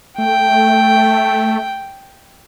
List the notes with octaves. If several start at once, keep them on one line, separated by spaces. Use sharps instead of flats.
A3 G5